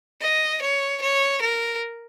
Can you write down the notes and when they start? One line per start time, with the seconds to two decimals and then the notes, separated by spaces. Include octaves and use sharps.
0.21 D#5
0.62 C#5
1.02 C#5
1.41 A#4